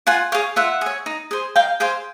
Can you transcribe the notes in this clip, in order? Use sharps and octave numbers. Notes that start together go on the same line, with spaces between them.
F4 F#5 G#5
G#4 C#5 F5 G5
F4 E5 F#5
G#4 C#5
D#4
G#4 C5
D#4 F5 G5
G#4 C5 F5 G5